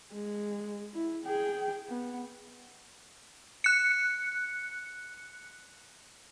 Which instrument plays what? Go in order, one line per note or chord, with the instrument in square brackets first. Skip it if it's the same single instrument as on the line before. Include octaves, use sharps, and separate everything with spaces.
[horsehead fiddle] G#3
E4
G#4 G5
B3
[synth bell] F#6 C#7